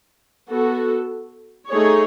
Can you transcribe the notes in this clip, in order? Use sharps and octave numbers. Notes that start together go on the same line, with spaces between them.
B3 F#4 A4
A3 D#4 G#4 C#5